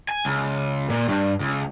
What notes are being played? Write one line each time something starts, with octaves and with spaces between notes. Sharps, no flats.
G#5
C#2
A#2
G2
C#2